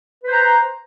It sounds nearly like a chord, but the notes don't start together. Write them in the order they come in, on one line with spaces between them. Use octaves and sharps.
B4 C5 A#5